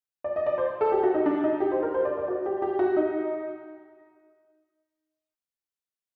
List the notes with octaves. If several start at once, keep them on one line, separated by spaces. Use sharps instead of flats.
D5
D#5
D5
C5
A4
G4
F#4
D#4
D4
D#4
G4
C5
A#4
C5
D5
D5
F#4
G4
G4
F#4
D#4